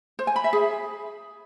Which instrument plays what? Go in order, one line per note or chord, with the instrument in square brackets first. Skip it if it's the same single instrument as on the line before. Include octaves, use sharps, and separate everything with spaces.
[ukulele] C5
G#5
B5
E5
G#4